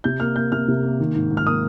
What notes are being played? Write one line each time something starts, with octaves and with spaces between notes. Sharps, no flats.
C3 G6
A#3 F6
A#3 G6
C3 F6
C3
A#3
D#3
G#2
G#2
F6
A#3 D#6